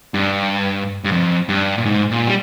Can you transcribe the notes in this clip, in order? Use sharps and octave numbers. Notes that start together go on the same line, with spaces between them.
G2
G2
F2
G2
A#2
G#2
A#2
G3